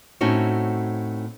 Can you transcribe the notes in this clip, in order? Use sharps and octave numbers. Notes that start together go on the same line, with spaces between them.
A2 C4 C#4 D#4 F#4